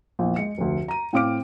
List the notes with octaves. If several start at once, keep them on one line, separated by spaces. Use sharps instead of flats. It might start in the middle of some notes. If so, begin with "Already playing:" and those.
A#1 E2
G#3 C#7
F1 D2
A#5 D#7
A2 C4 F5 D6 F6 D7